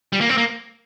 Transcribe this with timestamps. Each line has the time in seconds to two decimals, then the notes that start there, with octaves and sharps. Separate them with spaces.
0.13 G3
0.21 A#3
0.29 C4
0.38 A#3